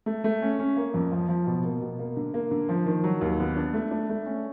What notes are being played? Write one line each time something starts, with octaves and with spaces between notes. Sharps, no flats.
A3
A3
C#4
C#4
A#3
F2
F3
F3
B2
A#3
B2
A#3
D3
A#3
D3
F3
D#3
F#3
D#2
B3
D4
A3
D4
A3
C#4